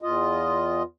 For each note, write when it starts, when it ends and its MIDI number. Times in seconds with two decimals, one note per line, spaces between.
0.02 0.83 40
0.02 0.83 65
0.02 0.83 75